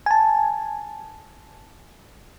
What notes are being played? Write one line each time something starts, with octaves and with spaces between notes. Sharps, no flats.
G#5 A5